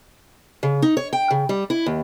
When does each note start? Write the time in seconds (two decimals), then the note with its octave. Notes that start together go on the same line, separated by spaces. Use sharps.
0.63 C#3
0.82 D#4
0.97 C#5
1.13 G5
1.30 C#3
1.49 G3
1.70 E4
1.86 D#2